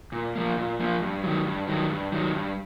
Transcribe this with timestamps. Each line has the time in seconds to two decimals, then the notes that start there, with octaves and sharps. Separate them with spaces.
0.12 A#2
0.35 F3 A#3
0.57 A#2
0.80 F3 A#3
1.02 G2
1.23 D#3 F#3
1.46 G2
1.68 D#3 F#3
1.90 G2
2.12 D#3 F#3
2.34 G2